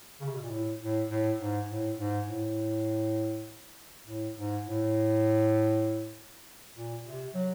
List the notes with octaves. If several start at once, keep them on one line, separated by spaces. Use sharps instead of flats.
C#3
C3
B2
A#2
A2
A2
A2
G#2
A2
G#2
A2
A2
G#2
A2
A#2
C3
F#3